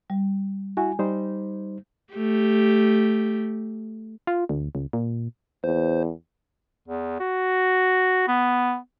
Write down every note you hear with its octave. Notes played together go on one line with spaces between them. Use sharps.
G3
E4 F#4 G#5
G3 D#4 C5
A3 G4
F4
D2
C#2
A#2
E2 C5
E2
F#4
B3